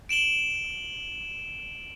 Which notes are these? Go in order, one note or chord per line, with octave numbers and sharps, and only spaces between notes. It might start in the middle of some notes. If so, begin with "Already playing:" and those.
D7 E7 F#7 G7